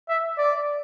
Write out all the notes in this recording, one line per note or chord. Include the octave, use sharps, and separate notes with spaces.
E5
D5